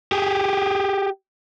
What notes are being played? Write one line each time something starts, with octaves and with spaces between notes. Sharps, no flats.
G4 G#4